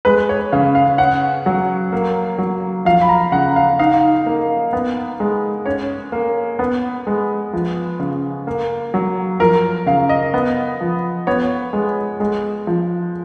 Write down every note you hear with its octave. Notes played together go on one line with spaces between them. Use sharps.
G#3 B4
C#5
C#3 F5
F5
C#4 F#5
F#3
A#3
F#3
F3 F5
B5
A#5
C#3 F#5
F5
D#4 F5
A#3
B3
G#3
C#4 C#5
A#3
B3
G#3
F3
C#3
A#3
F#3
F3 A#4
C#3 F5
D#5
B3
F3
B3 C#5
G#3
G#3
F3